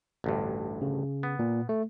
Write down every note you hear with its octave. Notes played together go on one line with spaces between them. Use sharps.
A1 D2 G2
C#3
B3
A#2
A3